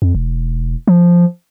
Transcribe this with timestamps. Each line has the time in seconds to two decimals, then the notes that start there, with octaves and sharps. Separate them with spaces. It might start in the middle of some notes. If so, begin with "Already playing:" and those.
0.02 F2
0.15 E1
0.87 F3